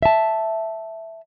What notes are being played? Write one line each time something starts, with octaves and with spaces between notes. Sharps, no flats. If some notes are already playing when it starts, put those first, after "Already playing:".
E5 A5